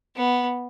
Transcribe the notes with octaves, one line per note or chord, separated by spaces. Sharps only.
B3